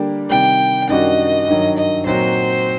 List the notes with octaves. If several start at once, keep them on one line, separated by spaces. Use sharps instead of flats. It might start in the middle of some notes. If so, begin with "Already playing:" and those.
Already playing: D3 G3 A#3 D4 G4
C3 D#3 G3 G5
F#2 D#3 G3 D4 F#4 D#5
G2 D#3 F#3
D#5
A#2 F#3 C4 D#4 F#4 C5